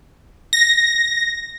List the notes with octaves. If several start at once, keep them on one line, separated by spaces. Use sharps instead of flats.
A#6